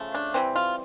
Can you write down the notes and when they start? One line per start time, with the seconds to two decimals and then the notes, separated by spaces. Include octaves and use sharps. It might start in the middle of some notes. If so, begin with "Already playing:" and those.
Already playing: C#3 F3 A3
0.15 D4
0.34 E3 G3 C4
0.56 F4